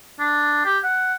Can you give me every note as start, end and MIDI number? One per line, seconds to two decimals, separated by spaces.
0.20 0.61 62
0.65 0.79 67
0.84 1.15 78